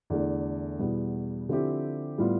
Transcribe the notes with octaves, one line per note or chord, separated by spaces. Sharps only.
E2 D3 A3 D4
E2 B2 G3 B3
D3 F3 C4 E4 G4
A2 G3 B3 F4